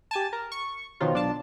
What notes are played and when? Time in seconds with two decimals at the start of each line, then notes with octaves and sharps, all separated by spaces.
0.11 G4 G#5 A5
0.33 A#4
0.52 C#6
1.00 B2 D#3 F3 F#3 F4
1.14 B1 D4 F4 A5